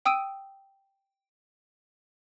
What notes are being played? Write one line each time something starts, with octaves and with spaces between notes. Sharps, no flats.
G5 D#6 E6 D7 D#7